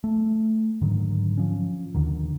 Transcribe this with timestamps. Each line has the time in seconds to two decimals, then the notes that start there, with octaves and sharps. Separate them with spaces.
0.04 A3
0.81 G#2 D3 D#3 F#3
1.38 F3 C#4
1.95 D#2 D3 D#3